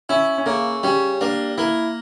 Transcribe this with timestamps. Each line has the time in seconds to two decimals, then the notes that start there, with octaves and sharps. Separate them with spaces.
0.09 C#4 E4
0.38 C#4
0.46 C#3 A#3
0.83 G3 C#4
1.21 A#3 D4
1.58 A#3 E4